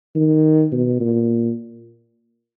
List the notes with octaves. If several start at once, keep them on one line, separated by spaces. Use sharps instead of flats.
D#3
B2
A#2